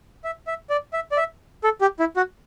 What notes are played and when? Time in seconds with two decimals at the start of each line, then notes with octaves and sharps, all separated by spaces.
0.24 E5
0.47 E5
0.70 D5
0.93 E5
1.12 D5
1.17 E5
1.64 A4
1.81 G4
2.00 E4
2.17 F#4